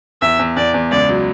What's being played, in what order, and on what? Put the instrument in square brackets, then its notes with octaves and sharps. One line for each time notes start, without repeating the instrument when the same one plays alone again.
[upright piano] E2 [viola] E5
[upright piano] E2
[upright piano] E2 [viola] D5
[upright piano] E2
[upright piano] C#2 [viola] D5
[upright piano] F#3